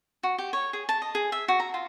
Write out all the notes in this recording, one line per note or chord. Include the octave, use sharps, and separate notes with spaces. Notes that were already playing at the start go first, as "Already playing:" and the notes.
F#4
G4
C#5
G#4
A5
D#5
G#4
E5
F#4
A#5
F4